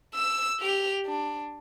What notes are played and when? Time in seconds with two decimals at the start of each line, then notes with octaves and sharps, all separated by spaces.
0.15 E6 E7
0.60 G4 F7
1.06 D4